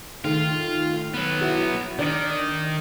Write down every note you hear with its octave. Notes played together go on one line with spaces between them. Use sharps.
D#3 A3 F4
F#3 B3
E4 F#4
D#3 D4 A6 D7